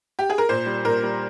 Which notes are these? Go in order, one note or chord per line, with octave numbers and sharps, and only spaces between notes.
G4
G#4
A#4
A#2 C5
G3
A#2 A#4
G3